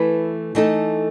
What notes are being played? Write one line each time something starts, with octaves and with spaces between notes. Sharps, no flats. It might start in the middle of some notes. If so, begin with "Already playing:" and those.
Already playing: E3 A3 E4 B4
E3 A3 D#4 A4